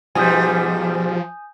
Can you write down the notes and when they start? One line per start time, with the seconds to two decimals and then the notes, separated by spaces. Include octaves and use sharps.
0.15 G#2 B2 F3 G3 G#5 D#6 G6